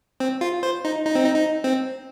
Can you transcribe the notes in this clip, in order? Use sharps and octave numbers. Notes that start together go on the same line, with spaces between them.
C4
F4
C5
D#4
D#4
C4
D#4
D#4
C4